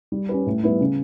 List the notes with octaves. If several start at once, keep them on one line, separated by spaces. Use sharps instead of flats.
G3
C#4 G4 B4
A2
G3 B3 E4
C#3